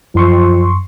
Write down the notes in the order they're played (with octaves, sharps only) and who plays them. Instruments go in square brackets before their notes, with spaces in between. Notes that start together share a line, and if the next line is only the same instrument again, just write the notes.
[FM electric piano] F#2 C6 C#6 [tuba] F3